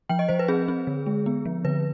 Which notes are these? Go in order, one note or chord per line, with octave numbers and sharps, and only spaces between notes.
F3 G5
D#5
F3 C5
B4
C4 G#4
C4
D3
G#3
B3
F3
D3 B4